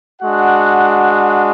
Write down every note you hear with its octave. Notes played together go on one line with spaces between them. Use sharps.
G#3 D4 F#4 F#5